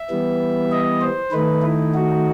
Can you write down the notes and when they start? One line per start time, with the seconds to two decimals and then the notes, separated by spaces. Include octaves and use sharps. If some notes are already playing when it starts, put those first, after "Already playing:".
Already playing: E5
0.10 E3 G3 B3
0.72 D#5
1.01 C5
1.32 D#3 A3 D#4 B4
1.62 E4
1.94 F#4